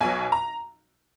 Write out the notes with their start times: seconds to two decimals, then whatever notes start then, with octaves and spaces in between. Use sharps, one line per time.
0.01 B1 B2 F#3 G#5
0.32 A#5